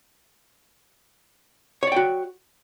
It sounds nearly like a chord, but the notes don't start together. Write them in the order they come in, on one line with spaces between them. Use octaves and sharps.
C#5 D5 G5 F#4